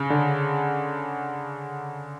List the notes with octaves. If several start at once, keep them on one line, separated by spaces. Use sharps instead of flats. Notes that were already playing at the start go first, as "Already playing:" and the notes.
Already playing: C#3
D3